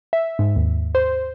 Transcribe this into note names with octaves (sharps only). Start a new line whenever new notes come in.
E5
G#2
D#2
C5